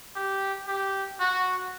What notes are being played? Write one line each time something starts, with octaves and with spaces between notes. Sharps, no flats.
G4
G4
F#4